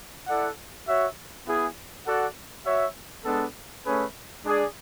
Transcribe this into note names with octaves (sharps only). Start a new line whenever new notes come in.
E4 A4 D5 F#5
F#4 C#5 E5
B3 E4 G#4
F#4 A4 D5 F#5
F#4 C#5 E5
G#3 B3 D4 A4
A3 C#4 G#4 B4
G#3 D4 G#4 D5